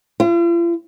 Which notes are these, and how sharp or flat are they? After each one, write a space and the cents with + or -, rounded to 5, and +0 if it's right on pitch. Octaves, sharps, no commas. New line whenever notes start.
F4 -45